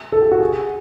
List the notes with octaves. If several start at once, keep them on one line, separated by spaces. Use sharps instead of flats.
A4
G4
F#4
G#4